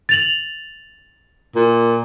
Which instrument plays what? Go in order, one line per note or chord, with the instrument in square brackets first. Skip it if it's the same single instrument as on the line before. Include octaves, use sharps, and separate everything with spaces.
[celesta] A6 F7 F#7
[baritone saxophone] A#2